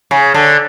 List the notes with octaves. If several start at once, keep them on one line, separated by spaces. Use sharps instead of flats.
C#3
D3